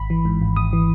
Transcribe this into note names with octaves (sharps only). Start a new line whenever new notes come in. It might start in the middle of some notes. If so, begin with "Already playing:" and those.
Already playing: G#1 B5
E3
G#2
G#1
G#1 D#6
E3